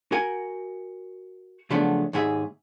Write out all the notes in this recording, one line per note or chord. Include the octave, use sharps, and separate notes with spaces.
F#4 A#4 G#5
C#3 F3 F#3 A3 B3 D4
D#2 G#2 G#4 E5